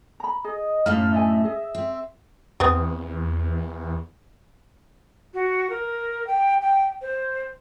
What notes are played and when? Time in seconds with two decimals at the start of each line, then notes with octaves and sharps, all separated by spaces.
0.20 A#5 B5
0.44 G#4 D#5
0.86 F#2 A2 A3 D#4 F5 F6
1.13 D4 D#5 E5 G#5
1.44 G#4 D#5
1.75 C4
2.60 E2 B3 C4 G#4
5.34 F#4
5.70 A#4
6.27 G5
6.61 G5
7.01 C5